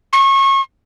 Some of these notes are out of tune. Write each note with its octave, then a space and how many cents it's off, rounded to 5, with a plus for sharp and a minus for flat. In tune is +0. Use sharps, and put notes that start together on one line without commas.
C#6 -30